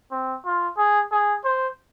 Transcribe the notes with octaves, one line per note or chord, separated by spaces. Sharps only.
C4
F4
G#4
G#4
C5